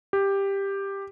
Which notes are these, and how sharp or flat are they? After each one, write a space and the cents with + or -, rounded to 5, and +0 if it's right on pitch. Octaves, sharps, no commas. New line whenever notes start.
G4 +10